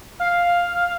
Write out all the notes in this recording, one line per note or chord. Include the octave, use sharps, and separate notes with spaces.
F5